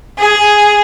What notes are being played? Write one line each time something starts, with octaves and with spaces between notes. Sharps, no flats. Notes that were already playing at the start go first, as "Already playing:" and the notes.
G#4